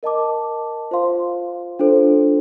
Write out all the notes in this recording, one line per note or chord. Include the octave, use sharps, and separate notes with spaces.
A#4 D#5 A5 D6
F4 C5 F5 C6
D4 F4 A4 C5